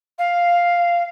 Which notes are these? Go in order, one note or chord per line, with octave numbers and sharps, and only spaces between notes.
F5